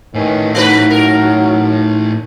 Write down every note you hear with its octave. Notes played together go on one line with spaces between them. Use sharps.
A2 D#3 C#4 B4 G#5
F#3 A3 D#4 B4
A#4